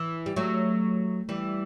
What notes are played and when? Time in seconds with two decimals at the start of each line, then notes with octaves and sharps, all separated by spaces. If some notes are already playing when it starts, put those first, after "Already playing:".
Already playing: E3
0.26 G3
0.36 F#3 A3
1.29 E3 G3